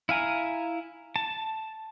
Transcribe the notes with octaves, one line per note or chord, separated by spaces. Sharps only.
E4 F5 G#5 A#5
A5